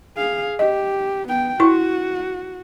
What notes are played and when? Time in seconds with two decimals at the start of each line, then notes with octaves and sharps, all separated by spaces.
0.17 G#4 F5
0.59 G4 D#5
1.28 B3 G5
1.60 E4 F#4 C#6